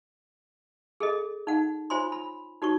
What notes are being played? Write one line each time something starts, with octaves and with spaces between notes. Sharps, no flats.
G#4 A4 D#5
D#4 F#5
F4 C5 C#5 G#5 B5 C6
B5
D#4 F#4 C#5 C#6